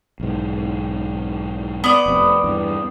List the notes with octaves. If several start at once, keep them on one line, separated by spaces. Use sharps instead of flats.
B1 G#2
B3 D5
F1 C3
E2 G2